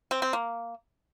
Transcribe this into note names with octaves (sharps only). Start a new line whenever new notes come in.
C4
C4
A#3